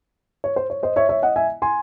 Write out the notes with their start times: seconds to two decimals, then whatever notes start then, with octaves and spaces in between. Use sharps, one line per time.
0.44 C#5
0.56 C5
0.70 C#5
0.83 C5 D#5
0.96 C#5 E5
1.09 C#5 E5
1.22 D#5 F#5
1.36 E5 G#5
1.62 G#5 C6